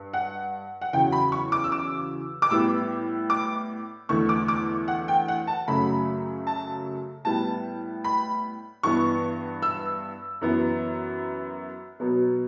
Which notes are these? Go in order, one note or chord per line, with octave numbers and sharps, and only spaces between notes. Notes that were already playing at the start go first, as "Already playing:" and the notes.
Already playing: G2
F#5
F#5
E2 C#3 F#3 G5
B5
C#6
D6
E6
D6
D6
A2 G3 B3 E6
D6
E2 D3 A3 C#6
D6
D6
F#5
G5
F#5
A5
F#2 C#3 F#3 A3 B5
A5
A2 G3 B3 A5
B5
G2 E3 B3 C#6
E6
F#2 E3 B3
B2 F#3 B3